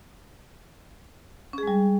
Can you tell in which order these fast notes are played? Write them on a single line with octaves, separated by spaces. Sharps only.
C#4 G#4 G#3 G3